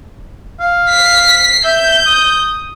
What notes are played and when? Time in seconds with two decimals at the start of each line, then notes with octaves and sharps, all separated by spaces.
0.60 F5
0.90 B6 C7
1.65 E5 G6
2.07 D#6